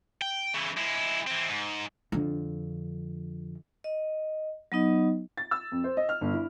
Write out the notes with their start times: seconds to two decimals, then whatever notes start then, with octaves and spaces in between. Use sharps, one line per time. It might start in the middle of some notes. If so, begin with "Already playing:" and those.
0.22 G5
0.55 C#3 E3
0.78 G#3 E4
1.27 E3 C4
1.49 G#2
2.12 F2 D3
3.84 D#5
4.72 F#3 B3 D#4 D#5
5.37 A6
5.51 E6
5.72 F2
5.84 C5
5.97 D#5
6.09 F6
6.21 G1
6.33 E4